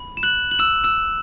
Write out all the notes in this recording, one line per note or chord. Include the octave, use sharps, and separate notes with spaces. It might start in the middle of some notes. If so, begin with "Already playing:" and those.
Already playing: B5
E7
F#6 F#7
F#7
E6 E7
E6 E7